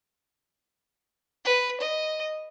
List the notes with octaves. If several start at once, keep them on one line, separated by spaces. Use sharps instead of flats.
B4
D#5